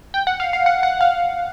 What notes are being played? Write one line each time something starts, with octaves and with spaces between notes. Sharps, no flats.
G5
F#5
F5
F5
F#5
F#5
F5